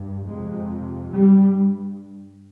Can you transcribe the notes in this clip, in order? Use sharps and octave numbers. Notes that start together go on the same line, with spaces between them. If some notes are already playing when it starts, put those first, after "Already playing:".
Already playing: G2
F2 C3 G#3
G2 G3